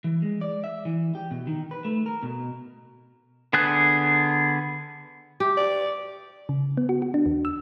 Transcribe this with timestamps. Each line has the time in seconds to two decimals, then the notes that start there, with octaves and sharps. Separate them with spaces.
0.04 E3
0.22 G#3
0.41 D5
0.64 E5
0.85 E3
1.15 G4
1.31 B2
1.47 D#3
1.71 B4
1.85 A3
2.06 A#4
2.23 B2
3.53 D3 B3 G#4 F#6
5.40 G4
5.57 D5
6.49 C#3
6.77 B3
6.89 F#4
7.02 F#4
7.14 D4
7.26 D#2
7.45 E6